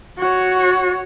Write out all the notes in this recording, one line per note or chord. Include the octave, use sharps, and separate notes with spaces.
F#4 C#5